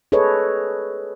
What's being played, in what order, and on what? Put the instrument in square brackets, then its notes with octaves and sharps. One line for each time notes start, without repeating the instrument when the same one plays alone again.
[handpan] G#4 A4 B4 C#5 D#5